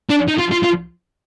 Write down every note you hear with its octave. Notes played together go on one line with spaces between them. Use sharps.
D4
D#4
F4
F4
F4